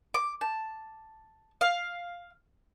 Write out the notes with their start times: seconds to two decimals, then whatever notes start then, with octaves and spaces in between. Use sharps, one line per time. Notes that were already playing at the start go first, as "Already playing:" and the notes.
0.14 D6
0.41 A5
1.61 F5